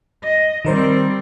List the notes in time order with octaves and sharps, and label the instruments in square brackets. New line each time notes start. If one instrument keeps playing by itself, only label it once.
[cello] D#5
[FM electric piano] D#3 A#4 C5 [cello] G3 C4